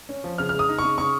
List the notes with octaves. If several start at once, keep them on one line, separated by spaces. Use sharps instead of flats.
C#4
F3
C#3 F6
F6
G#3
D#6
D#4
C#3 C#6
C#3 C#6